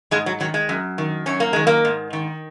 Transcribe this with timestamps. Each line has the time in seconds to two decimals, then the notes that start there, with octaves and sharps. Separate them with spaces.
0.11 G#2 G#3
0.26 F#3
0.40 D#3 F#3
0.54 G#3
0.69 F#2
0.98 D#3
1.26 F#2 C#4
1.40 A#3
1.53 D#3 G#3
1.67 A#3
1.85 G#2
2.13 D#3